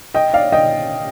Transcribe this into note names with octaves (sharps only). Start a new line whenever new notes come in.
D#5 G5
D5 F5
D#5 G5